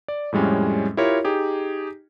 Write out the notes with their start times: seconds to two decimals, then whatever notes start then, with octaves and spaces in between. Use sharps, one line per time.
0.08 D5
0.32 F2 A2 G3 G#3 C#4
0.97 E4 F4 G4 A#4 C#5
1.24 D#4 G4 G#4